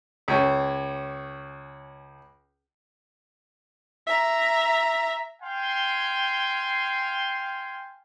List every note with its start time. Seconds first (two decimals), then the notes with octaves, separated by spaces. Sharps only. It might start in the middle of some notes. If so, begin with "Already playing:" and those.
0.28 C#2 C#4
4.07 E5 A#5
5.42 F5 G5 G#5 C6